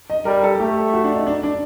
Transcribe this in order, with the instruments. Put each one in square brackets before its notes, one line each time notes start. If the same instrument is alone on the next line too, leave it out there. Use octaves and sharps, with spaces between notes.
[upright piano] D#5
[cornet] G3 [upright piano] A#4
[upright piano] A4
[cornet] A3 [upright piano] G4
[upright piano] F#4
D4
D#4
D4
D4